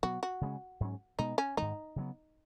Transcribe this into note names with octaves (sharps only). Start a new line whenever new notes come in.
B2 F#3 B3 F#4
F#4
C#3 G#3 C#4
G#2 F#3 C#4
B2 G#3 B3 D#4
C#4
G#2 D#3 G#3 D#4
C#3 F#3 B3